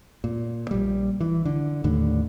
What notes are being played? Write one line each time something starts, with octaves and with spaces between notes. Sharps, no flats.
A#2
A#1 G3
E3
D3
D#2 A2 D3